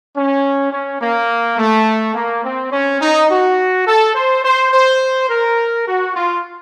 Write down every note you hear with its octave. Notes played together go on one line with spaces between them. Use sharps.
C#4
C#4
A#3
A3
A#3
C4
C#4
D#4
F#4
A4
C5
C5
C5
A#4
F#4
F4